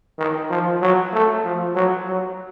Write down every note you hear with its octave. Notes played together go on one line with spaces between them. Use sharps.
D#3
F3
F#3
A3
F3
F#3
F#3